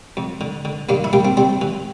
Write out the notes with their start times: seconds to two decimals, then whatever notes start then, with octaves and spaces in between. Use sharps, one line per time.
0.17 F2
0.41 D3
0.65 D3
0.89 G2 A#3 D4
1.04 E4
1.13 G3 A#3 D4
1.25 C4
1.37 G3 C4
1.61 E3